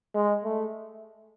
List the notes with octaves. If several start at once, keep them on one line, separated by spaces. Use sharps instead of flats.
G#3
A3